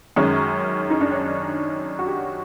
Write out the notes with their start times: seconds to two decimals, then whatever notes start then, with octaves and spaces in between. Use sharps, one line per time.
0.16 F#2 D#3 G#3 C#4
0.90 D#4
1.01 D4
1.11 C#4
1.99 F#4
2.06 G4